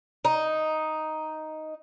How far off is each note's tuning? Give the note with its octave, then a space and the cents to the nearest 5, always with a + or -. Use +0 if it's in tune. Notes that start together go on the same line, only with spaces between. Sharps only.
D#4 +5